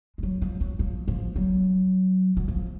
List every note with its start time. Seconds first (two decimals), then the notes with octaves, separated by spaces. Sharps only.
0.18 G#3
0.23 F#3
0.42 F3
0.61 F#3
0.79 F3
1.08 F3
1.36 F#3
2.37 F#3
2.48 F3